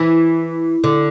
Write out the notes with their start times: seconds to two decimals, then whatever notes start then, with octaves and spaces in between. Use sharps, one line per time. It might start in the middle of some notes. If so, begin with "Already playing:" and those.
Already playing: E3
0.84 D3